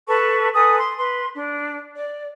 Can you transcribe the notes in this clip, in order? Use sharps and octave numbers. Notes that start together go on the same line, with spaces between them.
A4 B4 A5 C#6
A4 B4 G#5 D#6
C6
B4 C6
D4
D5